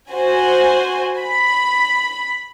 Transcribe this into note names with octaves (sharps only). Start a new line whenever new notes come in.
F#4 C5 G#5
B5